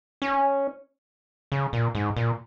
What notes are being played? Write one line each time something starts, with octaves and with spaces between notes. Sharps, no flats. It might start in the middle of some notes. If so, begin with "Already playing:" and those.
C#4
C#3
A#2
G#2
A#2